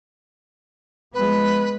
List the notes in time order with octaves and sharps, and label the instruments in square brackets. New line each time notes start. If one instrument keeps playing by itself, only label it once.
[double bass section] F3 G#3 B3 [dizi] B4